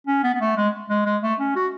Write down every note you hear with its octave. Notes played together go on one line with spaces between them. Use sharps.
C#4
B3
B3
A3
G#3
G#3
G#3
A3
C#4
F#4